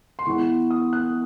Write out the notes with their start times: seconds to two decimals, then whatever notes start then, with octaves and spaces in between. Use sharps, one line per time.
0.19 C6
0.26 E3 G#3 B3 C#6
0.71 D#6
0.93 F#6